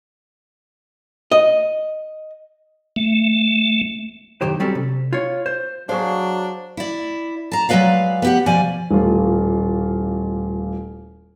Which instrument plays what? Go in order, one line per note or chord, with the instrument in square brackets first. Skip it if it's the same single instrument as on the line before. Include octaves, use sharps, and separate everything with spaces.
[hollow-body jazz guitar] D#5
[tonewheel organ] A3
[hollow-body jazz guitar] B1 F#2 D#3 G4 C5
F#3 G3 C4 C#4 A4
C3
F4 C#5
C5
[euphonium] F#3 [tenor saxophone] D4 [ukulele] F#4 G#4 F5 [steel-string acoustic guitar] C5
[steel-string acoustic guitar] E4 D5
A5 A#5
F#3 G#3 C4 B4 D5 F5
B3 G4 F#5
B2 F3 D5 G#5
[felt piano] D#1 A1 F4